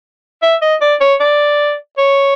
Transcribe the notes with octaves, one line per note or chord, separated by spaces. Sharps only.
E5
D#5
D5
C#5
D5
C#5